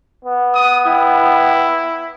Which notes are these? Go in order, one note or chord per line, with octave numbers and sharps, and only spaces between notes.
B3
D#6
E4 G5